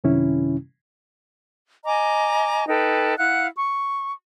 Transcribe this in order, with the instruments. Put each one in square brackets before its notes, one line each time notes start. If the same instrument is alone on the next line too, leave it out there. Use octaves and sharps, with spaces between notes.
[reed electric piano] F#2 C3 D#3 C#4 E4
[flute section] D#5 G#5 A#5 D6
D#4 A4 B4 G5
E4 F5 F#5 F#6
C#6